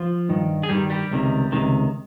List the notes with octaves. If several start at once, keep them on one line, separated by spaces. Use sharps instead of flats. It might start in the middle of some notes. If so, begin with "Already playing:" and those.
Already playing: F3 F4
G2 D#3
G#4
G2 D#3 G3 G4
G3 G4
C#2 C3 D#3
C#2 C3 D#3